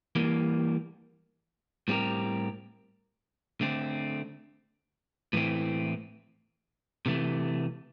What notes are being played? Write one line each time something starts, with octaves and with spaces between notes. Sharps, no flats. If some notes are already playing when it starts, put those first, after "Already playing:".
E3 G3 A#3
A2 G3 C4 G4 A#4
D3 A3 C4
A2 E3 A3 C4
C3 E3 A3